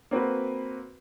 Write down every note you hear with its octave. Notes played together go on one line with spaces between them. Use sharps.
A#3 C4 F#4 B4